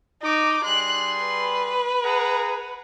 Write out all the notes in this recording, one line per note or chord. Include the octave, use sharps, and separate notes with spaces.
D#4 D6
G3 G#4 C6 F#6
B4
G#4 F#5 A#5